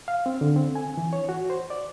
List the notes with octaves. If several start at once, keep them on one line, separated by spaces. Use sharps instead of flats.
F5
C4
D3
C4
G#5
E3
C#5
F#4
C5
D5